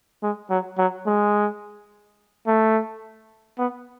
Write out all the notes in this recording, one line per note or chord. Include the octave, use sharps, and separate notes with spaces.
G#3
F#3
F#3
G#3
A3
B3